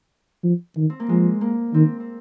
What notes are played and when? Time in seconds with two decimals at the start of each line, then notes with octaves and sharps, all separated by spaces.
0.44 F3
0.77 D#3
0.90 C4
1.00 A#3
1.09 F3 G#3
1.41 A#3
1.74 D#3 C4
2.00 C4